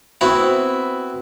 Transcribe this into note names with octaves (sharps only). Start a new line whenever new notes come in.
B3 C4 E4 F#4